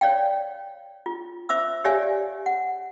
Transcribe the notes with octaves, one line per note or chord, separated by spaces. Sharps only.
C#5 D5 F5 G5
F4
C5 E5 D6 E6
G4 C#5 D5 E5 F5 G#5
F#5